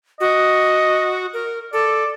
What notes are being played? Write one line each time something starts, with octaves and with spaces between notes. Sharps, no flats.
F#4 D#5
A#4
A4 D5